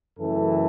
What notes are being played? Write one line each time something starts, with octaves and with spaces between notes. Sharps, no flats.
F#2 C#3 E3 A3 A4